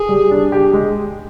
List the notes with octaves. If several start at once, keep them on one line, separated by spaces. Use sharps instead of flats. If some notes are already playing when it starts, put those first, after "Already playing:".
Already playing: G#4
G3
D4
G4
G#3